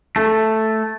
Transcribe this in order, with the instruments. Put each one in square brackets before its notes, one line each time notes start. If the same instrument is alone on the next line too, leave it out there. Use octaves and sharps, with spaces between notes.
[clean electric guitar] A3 [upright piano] A4